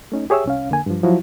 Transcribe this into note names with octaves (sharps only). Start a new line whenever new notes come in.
A3 C#4 D#4
G4 G#4 C#5 E5 E6
C2 C#4 F5
F2 D3 A#3 G#5
G2 F3
F3 F#3 E4 F#4